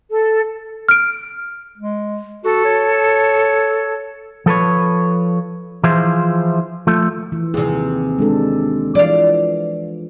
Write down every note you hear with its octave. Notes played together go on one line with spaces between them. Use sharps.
A4
F6 D7
G#3
F#4 A4
C#5
F3 A4 B4 C#5
E3 F3 E4 F4 G#4 C5
F3 A3
E3
D#2 C3 G#4
G#3 D4 A4
E3 F3 D5 F5